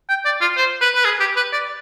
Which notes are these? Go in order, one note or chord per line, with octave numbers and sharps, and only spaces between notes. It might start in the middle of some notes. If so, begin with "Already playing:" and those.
G5
D5
F4
C5
B4
B4
G#4
G4
B4
D5